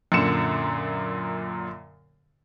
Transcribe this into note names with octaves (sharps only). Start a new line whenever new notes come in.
F#2 A#2 D3 C#7 E7